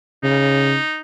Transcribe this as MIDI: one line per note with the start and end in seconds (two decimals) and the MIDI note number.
0.24 0.76 49
0.24 1.01 63